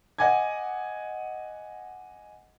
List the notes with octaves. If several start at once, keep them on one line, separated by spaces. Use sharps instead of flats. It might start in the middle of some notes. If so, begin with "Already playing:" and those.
D#5 F#5 G#5 D6 G#6